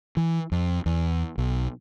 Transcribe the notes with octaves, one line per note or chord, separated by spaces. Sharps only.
E3
F2
E2
B1